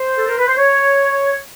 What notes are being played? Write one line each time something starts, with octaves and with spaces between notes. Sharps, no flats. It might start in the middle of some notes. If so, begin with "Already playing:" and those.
Already playing: C5
A4
A#4
B4
C5
C#5